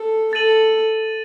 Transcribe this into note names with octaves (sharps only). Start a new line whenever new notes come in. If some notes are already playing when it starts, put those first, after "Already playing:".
Already playing: A4
A4 A6 D#7 F#7